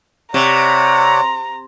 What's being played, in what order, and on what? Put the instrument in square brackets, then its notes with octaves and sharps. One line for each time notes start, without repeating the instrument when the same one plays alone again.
[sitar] C3 [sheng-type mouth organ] C#5 D5 F#5 [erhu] A#5